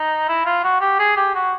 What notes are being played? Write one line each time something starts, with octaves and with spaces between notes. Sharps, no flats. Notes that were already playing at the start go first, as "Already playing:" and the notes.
Already playing: D#4
E4
F4
F#4
G4
G#4
G4
F#4